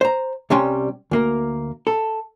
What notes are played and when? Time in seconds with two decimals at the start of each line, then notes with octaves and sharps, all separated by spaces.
0.01 C5 A#5
0.50 C2 C3 G3 C#4 G5 C6
1.11 D2 A#3 A#4
1.87 A4